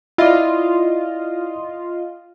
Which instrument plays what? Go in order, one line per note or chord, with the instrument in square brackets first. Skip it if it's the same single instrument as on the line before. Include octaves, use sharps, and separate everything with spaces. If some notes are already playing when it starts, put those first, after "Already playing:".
[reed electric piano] E4 D5 [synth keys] F4 D#5